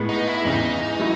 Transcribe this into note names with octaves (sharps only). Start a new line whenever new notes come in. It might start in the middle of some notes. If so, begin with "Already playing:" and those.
Already playing: A2 G#3 B3
D#4
E4
E2 C#3 E3 D#4
F#3 A3 E4